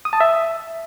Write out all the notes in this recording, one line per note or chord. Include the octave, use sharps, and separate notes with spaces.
D#6
A5
E5